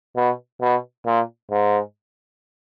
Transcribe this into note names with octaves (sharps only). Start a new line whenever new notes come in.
B2
B2
A#2
G#2